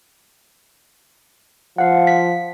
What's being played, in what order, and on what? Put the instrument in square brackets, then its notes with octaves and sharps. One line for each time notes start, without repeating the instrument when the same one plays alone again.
[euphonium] F3 [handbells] F5 F#5
[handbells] B6